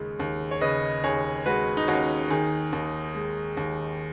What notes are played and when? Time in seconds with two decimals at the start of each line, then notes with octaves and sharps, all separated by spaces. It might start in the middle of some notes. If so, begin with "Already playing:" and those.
Already playing: D#2 C#3 G#3
0.19 D#2
0.51 C#5
0.61 C#3 B4 D#5
1.04 D#2 G#4 C#5
1.46 G#3 F#4 B4
1.77 D#4
1.88 D#2 C#4 F#4
2.30 D#3 D#4 G#4
2.73 D#2
3.15 G#3
3.57 D#2